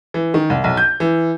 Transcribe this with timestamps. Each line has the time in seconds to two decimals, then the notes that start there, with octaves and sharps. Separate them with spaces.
0.14 E3
0.34 D#3
0.50 C2
0.64 B1
0.77 G6
1.00 E3